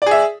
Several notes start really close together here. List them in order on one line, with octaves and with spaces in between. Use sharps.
D5 G#4 E5